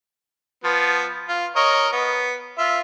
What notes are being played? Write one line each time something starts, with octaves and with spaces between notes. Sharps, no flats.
F3 B3
F4
A#4 C#5 D#5
B3
F4 E5